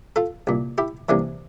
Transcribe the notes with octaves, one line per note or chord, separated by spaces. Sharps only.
F4 A4
C2 A#2
E4 G4
C2 C3 E3 A#3 D4